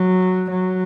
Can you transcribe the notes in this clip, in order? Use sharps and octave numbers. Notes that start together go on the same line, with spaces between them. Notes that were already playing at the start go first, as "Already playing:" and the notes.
Already playing: F#3
F#3